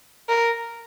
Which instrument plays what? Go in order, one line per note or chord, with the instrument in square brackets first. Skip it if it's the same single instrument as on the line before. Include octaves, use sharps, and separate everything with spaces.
[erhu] A#4